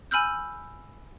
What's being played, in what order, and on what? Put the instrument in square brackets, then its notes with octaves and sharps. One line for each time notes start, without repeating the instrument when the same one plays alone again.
[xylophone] G#5 B5 E6 F6 G6